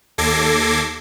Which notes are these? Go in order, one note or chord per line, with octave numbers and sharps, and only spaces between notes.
D#2 A4 D6 G#6 A#6 C7